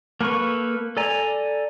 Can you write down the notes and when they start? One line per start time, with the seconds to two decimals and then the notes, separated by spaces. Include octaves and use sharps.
0.21 A#3 A4 B4 C#6
0.97 A4 D5 G#5 A#5